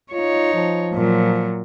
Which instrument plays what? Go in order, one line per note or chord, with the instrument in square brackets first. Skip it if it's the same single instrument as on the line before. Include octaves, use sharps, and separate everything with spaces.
[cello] D#4 C#5 [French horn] F4
[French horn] F3
[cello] A#2 F#3